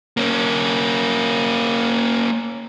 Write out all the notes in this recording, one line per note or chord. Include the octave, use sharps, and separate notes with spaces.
A#3 C#4